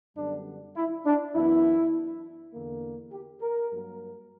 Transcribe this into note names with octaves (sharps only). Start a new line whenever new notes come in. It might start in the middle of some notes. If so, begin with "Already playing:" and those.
F#2 D3 G3 B3 D4
E4
D4
F#2 E3 B3 E4
E2 D3 A#3
G4
A#4
G2 F#3 A#3